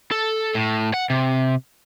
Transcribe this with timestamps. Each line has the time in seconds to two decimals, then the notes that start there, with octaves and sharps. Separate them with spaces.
0.11 A4
0.54 A2
0.94 F#5
1.10 C3